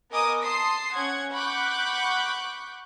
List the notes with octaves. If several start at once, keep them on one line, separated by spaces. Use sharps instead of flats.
B3 A#4 D#5 G#5 D6 D#6
A5 C6 D#6 C7
C#4 F#5 G#6
F#5 B5 C#6 D6 F#6 G6